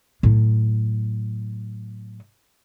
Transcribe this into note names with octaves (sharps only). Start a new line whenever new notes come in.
A2 F#3